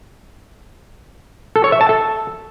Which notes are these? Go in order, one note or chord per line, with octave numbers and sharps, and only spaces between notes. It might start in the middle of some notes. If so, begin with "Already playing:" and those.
A4
C#5
E5
A5
A4